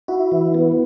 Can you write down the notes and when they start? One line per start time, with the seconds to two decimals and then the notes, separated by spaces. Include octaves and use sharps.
0.08 E4 F#4
0.32 E3
0.55 B3